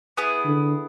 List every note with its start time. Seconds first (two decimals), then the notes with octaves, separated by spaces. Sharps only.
0.17 B3 E4 G#4
0.45 D3